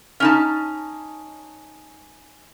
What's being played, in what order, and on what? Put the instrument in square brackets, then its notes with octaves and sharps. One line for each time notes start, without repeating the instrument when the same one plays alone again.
[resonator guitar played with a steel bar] C#4 D#4 A5